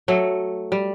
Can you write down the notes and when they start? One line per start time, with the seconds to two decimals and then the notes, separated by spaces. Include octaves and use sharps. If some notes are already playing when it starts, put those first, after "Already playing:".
0.08 F#3 A3
0.72 G3